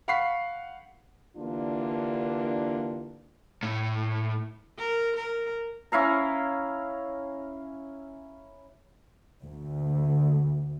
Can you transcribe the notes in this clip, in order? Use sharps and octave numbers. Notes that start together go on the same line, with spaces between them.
F5 F#5 B5 C#6 B6 C7
D3 E3 A#3 D4 F4 G4
A2
A#4
A#4
C#4 E4 F5 A#5
D2